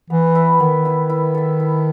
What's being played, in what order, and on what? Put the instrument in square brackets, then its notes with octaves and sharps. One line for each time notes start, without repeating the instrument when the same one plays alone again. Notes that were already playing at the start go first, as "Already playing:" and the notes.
[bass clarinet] E3 [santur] B3
[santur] E4 B4 E5
[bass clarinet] D#3 [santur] B3
[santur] E4 B4 E5
E4
A4 E5
E4